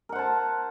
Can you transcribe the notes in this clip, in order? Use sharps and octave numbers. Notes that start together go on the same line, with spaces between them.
A#4 C5 F#5 A5